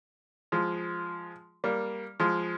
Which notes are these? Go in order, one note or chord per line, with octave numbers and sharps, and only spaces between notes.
F3 G#3
G3 A#3
F3 G#3